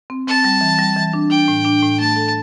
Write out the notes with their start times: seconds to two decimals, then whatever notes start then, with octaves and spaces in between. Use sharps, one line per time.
0.10 C4
0.27 C4 A5
0.44 G3
0.61 E3
0.79 G3
0.96 E3
1.13 D4
1.30 D4 G5
1.48 A2
1.65 D4
1.82 A2
1.99 A3 A5
2.16 A4